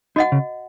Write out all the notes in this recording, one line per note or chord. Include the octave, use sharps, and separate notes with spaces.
D#4 F#4 D#5 F#5
C#3